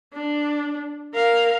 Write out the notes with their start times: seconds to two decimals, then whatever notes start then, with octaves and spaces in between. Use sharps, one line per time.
0.13 D4
1.14 A#4 F5